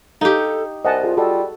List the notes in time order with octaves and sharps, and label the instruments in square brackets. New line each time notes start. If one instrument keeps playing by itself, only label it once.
[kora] D#4 G4 [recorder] A4 [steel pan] F5
[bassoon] C2 [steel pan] D#5 F#5 A5 [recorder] G#5
[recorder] F4 [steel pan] G#4
[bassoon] G3 [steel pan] F#4 A4 D#5